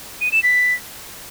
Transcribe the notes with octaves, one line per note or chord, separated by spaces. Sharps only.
D#7
E7
B6